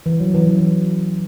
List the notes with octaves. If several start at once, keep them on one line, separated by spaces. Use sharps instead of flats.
E3
F#3
E3
F#3
E3